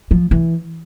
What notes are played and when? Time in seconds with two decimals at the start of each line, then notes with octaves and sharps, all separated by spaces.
0.11 F3
0.31 E3